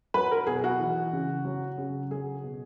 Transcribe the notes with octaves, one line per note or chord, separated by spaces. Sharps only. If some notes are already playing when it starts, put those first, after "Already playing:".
F#3 B4
A#4
B2 G#4
F#4
E3
C#3
F#3
C#3
F#3 G#4
B2